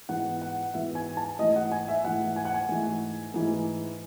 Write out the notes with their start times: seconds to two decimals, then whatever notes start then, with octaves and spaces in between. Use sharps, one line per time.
0.09 G#2 E3 B3 F#5
0.42 F#5
0.74 G#2 E3 B3 E5
0.95 G#5
1.17 A5
1.38 G#2 E3 A3 D#5
1.56 F#5
1.72 G#5
1.88 E5
2.04 G#2 E3 A3 F#5
2.36 G#5
2.45 F#5
2.54 G#5
2.69 G#2 E3 A3
3.34 G#2 E3 A3